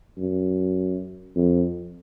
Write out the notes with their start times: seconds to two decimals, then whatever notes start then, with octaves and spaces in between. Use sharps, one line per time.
0.19 F#2
1.36 F2